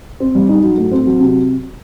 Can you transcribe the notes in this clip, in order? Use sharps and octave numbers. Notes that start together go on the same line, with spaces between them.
C4
G3
D#4
F#3
A2
C4
F#3
C3